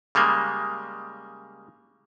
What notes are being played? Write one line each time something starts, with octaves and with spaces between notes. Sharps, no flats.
C#3 G3 G#3 A#3